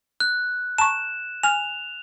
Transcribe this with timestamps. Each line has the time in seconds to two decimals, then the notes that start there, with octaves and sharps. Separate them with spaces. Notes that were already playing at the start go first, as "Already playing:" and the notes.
0.20 F#6
0.78 A5 A#5 C#6 E7
1.43 G#5 F6 F7